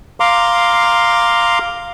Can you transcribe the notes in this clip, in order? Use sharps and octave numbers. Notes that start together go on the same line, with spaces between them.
F5 A#5 C6 D6